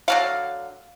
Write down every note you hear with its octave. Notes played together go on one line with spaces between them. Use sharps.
D3 F#3 F5